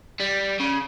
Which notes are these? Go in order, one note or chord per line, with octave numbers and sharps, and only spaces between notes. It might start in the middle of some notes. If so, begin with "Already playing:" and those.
G3
C#3